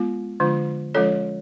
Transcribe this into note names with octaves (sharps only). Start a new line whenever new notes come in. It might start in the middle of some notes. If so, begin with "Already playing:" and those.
Already playing: G#3 B3 F4
D3 F3 G#3 D4 F4
F3 G#3 C#4 F4 A4 C#5